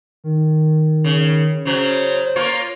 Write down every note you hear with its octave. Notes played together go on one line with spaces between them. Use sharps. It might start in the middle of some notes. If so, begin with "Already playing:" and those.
D#3
C#3
C#3 F#3 C5
A#3 F4 C#5